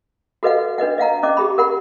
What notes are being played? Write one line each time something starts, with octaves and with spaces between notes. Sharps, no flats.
F#4 A4 B4 D#5 F5 F#5
D4 B4 D#5 F#5
D#5 F5 F#5 A#5
C#4 D#5 D6
G4 G#4 B5
A#4 F#5 B5